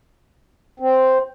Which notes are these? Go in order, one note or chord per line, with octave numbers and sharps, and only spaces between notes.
C4